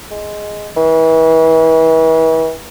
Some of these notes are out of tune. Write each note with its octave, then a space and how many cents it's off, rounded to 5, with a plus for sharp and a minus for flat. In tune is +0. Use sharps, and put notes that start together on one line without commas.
G#3 +5
E3 -35